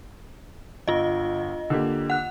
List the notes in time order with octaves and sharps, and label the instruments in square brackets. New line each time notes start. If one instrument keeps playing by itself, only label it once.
[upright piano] G1 [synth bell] F4 D#5
[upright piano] D3 A#3 G4
[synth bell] F#5 F#6